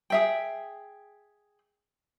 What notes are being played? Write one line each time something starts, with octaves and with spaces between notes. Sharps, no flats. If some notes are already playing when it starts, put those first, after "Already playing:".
G#4 E5 G5